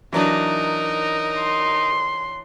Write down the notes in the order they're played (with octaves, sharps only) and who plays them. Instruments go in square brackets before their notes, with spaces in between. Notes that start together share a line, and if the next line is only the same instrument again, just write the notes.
[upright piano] E3 F#3 D4 [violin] D#4 A#4
[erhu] C6